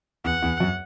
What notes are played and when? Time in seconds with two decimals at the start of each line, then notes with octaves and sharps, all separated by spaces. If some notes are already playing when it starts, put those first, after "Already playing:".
0.24 E2 F#5
0.42 E2
0.60 F#2